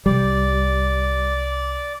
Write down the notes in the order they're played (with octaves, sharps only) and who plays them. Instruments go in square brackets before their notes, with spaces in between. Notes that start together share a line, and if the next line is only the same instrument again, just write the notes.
[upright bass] C2 [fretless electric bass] G3 [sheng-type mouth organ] D5